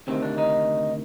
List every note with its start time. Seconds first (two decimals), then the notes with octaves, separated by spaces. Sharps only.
0.07 D2 C3 D#3 C4
0.22 D4
0.38 D#4